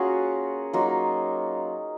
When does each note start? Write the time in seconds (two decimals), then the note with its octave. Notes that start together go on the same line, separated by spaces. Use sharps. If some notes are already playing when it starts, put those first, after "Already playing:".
Already playing: A#3 C#4 F4 F#4 G#4 A#4 C#5
0.73 F#3 A#3 D#4 F4